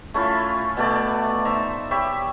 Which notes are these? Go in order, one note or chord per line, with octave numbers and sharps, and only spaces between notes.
A3 C#4 E4 F4
B2 A3 D5
D#4 C5 E5 A#5
G4 C#5 E5 B5